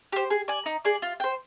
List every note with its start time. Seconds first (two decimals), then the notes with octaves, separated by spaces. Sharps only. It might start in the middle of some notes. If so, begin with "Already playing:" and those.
0.12 G4 C5
0.30 G#4
0.48 D5 G#5
0.66 D#4
0.85 G#4 D5
1.02 F4
1.20 C5 G5